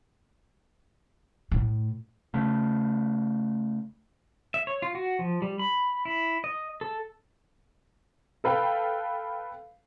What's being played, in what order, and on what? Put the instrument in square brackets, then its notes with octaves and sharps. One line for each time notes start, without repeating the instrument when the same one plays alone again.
[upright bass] A2
[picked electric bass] C#3 A3
[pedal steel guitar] E5
C#5
F4
F#4
F3
G3
B5
E4
D#5
A4
[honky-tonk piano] A4 B4 F5 G5